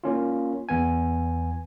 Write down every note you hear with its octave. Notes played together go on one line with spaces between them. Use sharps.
A#3 C#4 F4
E2 B3 G#5